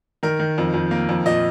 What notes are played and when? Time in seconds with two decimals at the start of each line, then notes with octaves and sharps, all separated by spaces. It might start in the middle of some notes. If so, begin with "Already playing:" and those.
0.23 D#3 A#4
0.39 D#3
0.58 F2
0.74 F2
0.91 A#3
1.09 F2
1.26 A#2 D#5